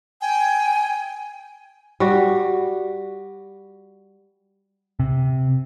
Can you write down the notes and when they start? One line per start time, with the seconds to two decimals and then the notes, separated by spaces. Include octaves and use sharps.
0.21 G5 G#5
2.00 G3 F#4
5.00 C3